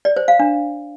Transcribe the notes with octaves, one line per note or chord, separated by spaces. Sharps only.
D5
C5
F5
D4